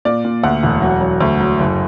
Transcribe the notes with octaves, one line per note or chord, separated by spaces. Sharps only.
A#2 D5
A#2
D2 F#5
E1
F#3
F#3
D2
F#3
F#1